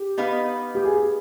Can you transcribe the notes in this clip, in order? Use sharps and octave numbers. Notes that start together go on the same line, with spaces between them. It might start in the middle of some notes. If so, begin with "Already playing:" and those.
Already playing: G4
B3 D#4 B4 F5
G4
G#4